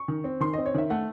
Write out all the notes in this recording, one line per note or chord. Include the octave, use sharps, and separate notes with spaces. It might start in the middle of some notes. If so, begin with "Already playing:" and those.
Already playing: C#6
D#3
C4
D#3 C6
C4 D#5
C#5
D#3 E5
A3 F#5